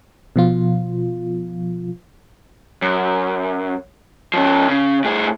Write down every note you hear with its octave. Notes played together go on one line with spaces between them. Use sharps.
B2 F3 F4
F#2
F3 C#4
C#3
A2 G#4